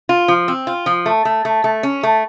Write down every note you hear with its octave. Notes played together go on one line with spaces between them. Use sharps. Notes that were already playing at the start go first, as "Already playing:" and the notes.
F4
F3
C4
F4
F3
A3
A3
A3
A3
C#4
A3